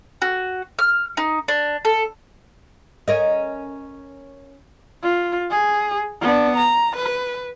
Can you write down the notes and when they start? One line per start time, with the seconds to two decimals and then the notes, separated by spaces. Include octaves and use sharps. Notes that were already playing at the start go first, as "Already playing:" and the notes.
0.22 F#4
0.79 F6
1.17 D#4
1.48 D4
1.85 A4
3.08 C#4 A#4 D#5
5.03 F4
5.51 G#4
6.21 B3 D4
6.57 A#5
6.96 B4